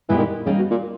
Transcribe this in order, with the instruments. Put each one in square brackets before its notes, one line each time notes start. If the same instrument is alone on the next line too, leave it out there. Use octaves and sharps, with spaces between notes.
[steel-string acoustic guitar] A#2 G#3 B3 E4 G4 [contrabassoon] E3
[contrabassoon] D#3
[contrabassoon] C#3 [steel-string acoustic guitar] G3 A#3 D#4
[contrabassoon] B2
A#2